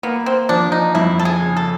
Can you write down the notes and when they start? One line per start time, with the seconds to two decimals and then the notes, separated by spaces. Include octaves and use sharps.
0.03 A#3 B3
0.26 C4
0.49 F3 D4
0.72 D#4
0.95 F2 E4
1.19 A4
1.25 G#4
1.41 C#3
1.57 A4